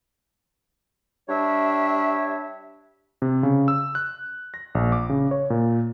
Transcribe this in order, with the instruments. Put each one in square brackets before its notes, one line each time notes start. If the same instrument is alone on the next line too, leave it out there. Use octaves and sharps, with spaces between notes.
[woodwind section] G3 D4 C#5 E5
[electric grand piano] C3
C#3
E6
F#6
A#6
A#1
D6
C#3
C#5
A#2